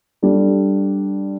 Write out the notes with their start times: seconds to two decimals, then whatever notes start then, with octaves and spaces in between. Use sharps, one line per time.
0.22 G3 D4 A4